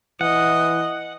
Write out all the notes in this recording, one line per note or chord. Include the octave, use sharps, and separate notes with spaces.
E3 D#5 F#5